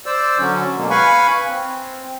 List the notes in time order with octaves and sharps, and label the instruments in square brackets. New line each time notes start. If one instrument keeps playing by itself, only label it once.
[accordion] C5 D5 E6
D3 F#3 C#4
B2 F#3 G#3 A#3
B4 F5 G#5 B5 C#6
C4